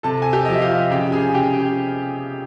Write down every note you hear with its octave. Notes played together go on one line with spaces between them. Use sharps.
C3 A4 A5
G#5
G4 G5
F3 D#5
E5
F4 F5
C#3 G4 G5
G#4 G#5
G#5
C#3 G4 G5